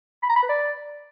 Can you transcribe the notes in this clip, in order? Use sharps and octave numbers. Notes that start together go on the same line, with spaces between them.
B5
A#5
B5
B4
D5